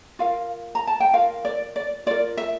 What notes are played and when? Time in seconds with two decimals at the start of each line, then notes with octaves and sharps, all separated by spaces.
0.19 F4 A#4 F5
0.75 A#5
0.87 A5
1.00 G5
1.13 F4 A#4 F5
1.45 D5
1.76 D5
2.06 F4 A#4 D5
2.37 E5